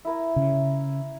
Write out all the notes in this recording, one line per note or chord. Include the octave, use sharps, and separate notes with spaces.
E4 A#4
C#3